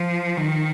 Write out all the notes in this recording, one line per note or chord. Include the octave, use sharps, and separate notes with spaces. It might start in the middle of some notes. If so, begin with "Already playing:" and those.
Already playing: F3
D#3